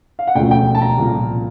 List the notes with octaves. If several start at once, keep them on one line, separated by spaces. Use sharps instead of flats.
F5
F#5
E1 D2 C#3 F3 A3 G5
G5
A5
A#5
C2 A#2 F3